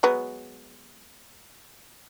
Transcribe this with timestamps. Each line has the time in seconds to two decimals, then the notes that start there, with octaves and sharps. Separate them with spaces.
0.03 F#3 G#3 B3